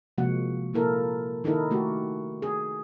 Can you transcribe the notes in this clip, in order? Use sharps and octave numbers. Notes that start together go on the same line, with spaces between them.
C3 F3 G#3 A#3 F#4 F#5
A#2 A#3 E4 A4 A#4
D#3 D#4 E4 A4 A#4
A3 F#4 G4
G#4